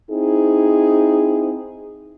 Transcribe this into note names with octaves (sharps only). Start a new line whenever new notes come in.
C4 D#4 E4 G#4